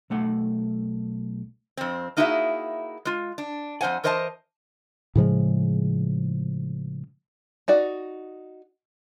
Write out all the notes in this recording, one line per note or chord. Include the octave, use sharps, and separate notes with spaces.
B1 A3 F#5
F2 C4
A#3 D#4 E4 F#4 G#4 E5
G#3 F4
D4
F2 G#3 C5 F#5 G#5
E3 A#4 C5 D#5 G5 A5
A2 C#3 F3 G#3
D#4 F#4 D5